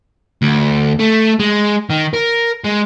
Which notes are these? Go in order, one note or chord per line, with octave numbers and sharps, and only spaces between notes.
D2
A3
G#3
D#3
A#4
G#3